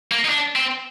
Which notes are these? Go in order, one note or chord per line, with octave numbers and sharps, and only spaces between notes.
A#3
D#4
D4
C4